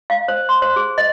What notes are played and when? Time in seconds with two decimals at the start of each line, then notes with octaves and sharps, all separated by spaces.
0.10 F5
0.28 C5
0.49 C6
0.62 C5
0.76 G#4
0.98 D#5